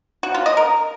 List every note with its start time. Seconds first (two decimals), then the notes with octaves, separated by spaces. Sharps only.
0.23 F#4
0.34 F4
0.46 D#5
0.57 A#4